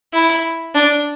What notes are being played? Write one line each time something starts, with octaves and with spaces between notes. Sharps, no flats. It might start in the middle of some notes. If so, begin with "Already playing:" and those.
E4
D4